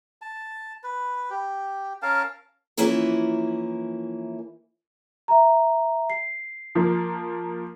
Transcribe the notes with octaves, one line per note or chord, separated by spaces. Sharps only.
A5
B4
G4
C#4 A#4 F5 A5
E3 F3 A#3 C#4 E4 A#4
E5 A#5
C7
F3 A#3